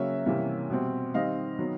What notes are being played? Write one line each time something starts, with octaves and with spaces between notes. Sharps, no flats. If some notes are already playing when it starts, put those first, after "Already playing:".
Already playing: C#3 F#3 A#3 C#4 E5
C3 E3 G3 A#3 C#4
B2 G3 C4
D#3 G3 C4 D#5 F5
D#3 F#3 B3